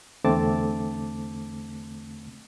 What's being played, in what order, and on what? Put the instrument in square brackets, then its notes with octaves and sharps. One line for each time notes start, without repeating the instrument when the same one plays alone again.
[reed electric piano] E2 D3 A3 C4 A5 D6